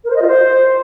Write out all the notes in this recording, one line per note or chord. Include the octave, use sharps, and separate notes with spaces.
A#4
C5
D#5
F4
C5